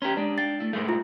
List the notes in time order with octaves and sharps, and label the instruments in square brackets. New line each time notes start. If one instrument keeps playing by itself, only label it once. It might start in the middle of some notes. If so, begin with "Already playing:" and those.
[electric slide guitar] C#4 G4 [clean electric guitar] B4 A#5 C6
[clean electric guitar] G#3 D#4 G4 [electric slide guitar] D4
[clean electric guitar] F5 G5 [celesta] A6
[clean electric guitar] A3 E4
[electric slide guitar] G#2 G#3 A3 [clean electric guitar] D#4 A#4
[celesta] F4